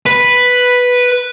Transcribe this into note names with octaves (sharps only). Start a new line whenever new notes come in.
B4